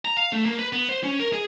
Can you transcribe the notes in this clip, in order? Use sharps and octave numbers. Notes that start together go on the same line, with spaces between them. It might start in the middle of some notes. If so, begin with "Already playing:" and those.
A#5
F5
A3
A#3
B4
B3
C5
C#4
A#4
G#4